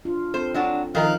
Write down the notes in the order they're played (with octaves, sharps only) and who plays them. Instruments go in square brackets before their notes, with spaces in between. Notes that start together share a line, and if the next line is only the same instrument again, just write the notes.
[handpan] D4 F4
[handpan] C4 A4 [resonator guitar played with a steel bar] C5
[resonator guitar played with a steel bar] F#3 D4 F#4
[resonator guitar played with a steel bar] D#3 A#4 [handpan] F3 E5 [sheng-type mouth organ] D#4 F5 F#6